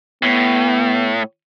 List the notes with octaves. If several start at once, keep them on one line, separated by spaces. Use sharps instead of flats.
A2 B3